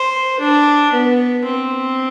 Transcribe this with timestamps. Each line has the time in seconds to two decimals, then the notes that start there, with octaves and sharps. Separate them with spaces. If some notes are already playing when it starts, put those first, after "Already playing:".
Already playing: C5
0.39 D4
0.92 B3
1.46 C4